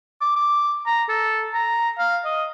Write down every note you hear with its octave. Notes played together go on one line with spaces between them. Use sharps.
D6
D6
A#5
A4
A#5
F5
D#5